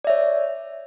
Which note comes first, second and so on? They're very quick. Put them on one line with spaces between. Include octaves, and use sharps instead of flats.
D5 E5 C#5